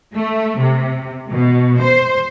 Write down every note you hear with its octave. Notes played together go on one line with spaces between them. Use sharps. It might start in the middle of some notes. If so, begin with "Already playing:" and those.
A3
C3
B2
C5